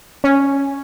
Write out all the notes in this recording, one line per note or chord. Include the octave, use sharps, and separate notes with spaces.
C#4